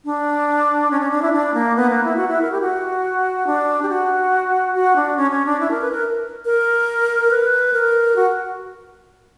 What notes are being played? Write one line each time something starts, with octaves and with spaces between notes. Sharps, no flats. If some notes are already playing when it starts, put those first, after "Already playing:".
D4
C#4
C#4
D4
E4
D4
A#3
B3
A#3
E4
F#4
E4
A#4
G4
F#4
D4
G4
F#4
F#4
D4
C#4
C#4
D4
E4
A#4
B4
A#4
A#4
B4
A#4
F#4